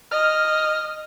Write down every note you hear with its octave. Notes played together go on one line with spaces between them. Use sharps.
D#5 F6